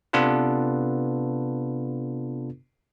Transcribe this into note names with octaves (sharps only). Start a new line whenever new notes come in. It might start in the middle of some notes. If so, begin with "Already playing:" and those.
C3 B3 D4 F4 A4 B4